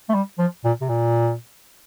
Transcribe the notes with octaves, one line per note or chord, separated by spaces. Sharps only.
A3
G3
F3
A#2
C3
A#2